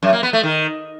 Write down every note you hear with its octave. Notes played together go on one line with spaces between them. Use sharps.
F#2
A#3
B3
A3
D#3